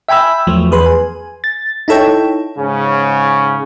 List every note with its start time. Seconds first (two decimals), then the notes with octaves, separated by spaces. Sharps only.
0.08 E5 G5 G#5 B5 E6
0.47 E2 F3 F#3 A3
0.71 E2 G#4 B4 C6
0.86 G#5
1.44 A6
1.88 D#4 E4 A4 C#5 G5
2.58 G#2 C#3 C#4